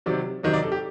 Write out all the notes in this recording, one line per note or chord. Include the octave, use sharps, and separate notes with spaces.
C3 D#3 F#3 D5
C3 D#3 F#3 D#5
D5
A4
G4